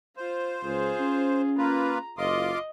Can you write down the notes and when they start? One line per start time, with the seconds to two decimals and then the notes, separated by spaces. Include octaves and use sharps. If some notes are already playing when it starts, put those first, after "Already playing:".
0.17 F4 C5
0.64 C#2 F4 G#4
1.00 C#4
1.58 A#3 F4 B4 A#5
2.18 F#1 F4 D#5 C6 D6